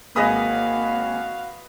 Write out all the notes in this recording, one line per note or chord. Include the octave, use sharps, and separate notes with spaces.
G#1 A#3 F#4 G#4 B4 D#5 F5 D#6